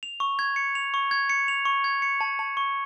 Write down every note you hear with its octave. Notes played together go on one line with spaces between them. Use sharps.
F7
C#6
G#6
C#7
F7
C#6
G#6
C#7
F7
C#6
G#6
C#7
A5
A5
C#6